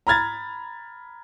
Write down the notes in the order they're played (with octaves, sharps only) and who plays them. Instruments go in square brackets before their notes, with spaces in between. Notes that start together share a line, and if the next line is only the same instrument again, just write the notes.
[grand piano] A#5 B5 F6 G#6 A6